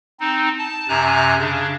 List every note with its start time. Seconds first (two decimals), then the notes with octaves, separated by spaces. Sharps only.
0.20 C4 D#4
0.59 A5
0.89 F#2 C3 G#5 A#5 F#6
1.39 C#3 D4